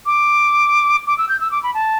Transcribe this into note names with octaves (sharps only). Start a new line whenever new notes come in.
D6
D6
E6
G6
E6
D6
B5
A5